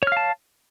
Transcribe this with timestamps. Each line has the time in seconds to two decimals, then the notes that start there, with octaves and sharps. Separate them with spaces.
0.03 C#5
0.07 F6
0.12 F5
0.17 A5